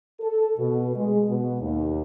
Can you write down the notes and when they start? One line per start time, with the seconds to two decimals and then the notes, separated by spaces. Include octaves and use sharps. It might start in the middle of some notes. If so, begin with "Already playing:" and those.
0.20 A4
0.58 B2
0.96 G#3
1.29 B2
1.61 D#2